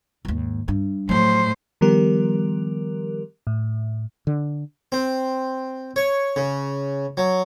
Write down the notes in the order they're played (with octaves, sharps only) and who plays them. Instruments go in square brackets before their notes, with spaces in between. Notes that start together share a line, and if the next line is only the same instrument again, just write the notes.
[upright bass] D#2 G#2
G2
[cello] A2 C5 [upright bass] F3 F#3
[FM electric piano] D#3 F3 G3 B3 G4 A#4
A2
[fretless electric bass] D3
[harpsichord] C4
C#5
C#3
F#3